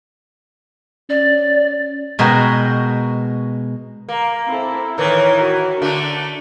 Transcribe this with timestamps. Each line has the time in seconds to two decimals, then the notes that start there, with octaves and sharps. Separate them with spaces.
1.10 C#4 D5
2.19 B2 G#3 F#4 A#4 G5
4.09 A#3
4.49 C4 E4 A4
4.98 A2 D#3 E3 A#4
5.36 F#4 A#4
5.82 D3 A3 D4